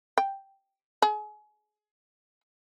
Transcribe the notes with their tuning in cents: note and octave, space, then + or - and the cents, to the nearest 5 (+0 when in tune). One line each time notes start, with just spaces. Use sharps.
G5 -5
G#4 +30